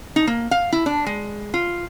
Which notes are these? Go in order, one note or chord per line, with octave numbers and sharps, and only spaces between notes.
D#4
A#3
F5
E4
D4
G#3
F4